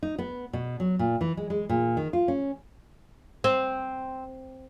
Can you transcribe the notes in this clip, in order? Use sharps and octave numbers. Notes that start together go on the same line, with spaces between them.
D#4
B3
B2
F#3
A#2
E3
G#3
G#3
A#2
D#3
F4
C#4
C4